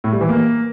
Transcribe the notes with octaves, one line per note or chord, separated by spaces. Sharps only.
A2
G3
E3
A#3